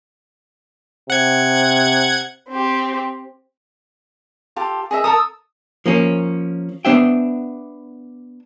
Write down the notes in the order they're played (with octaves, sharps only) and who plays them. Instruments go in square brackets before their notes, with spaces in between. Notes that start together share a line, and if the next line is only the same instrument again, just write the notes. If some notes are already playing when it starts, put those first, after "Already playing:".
[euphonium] C3 [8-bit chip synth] F#5 G#6
[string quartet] C4 G4
[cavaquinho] F4 G4 A4
G#4 D#5 E5
[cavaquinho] A4 A#4 A5 [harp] D#6 E6
[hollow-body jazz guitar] F3 A#3 C#4
B3 D4 C5 E5 G5